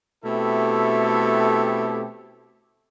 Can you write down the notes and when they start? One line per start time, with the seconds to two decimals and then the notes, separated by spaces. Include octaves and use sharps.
0.25 B2 A3 C4 E4 G4 A4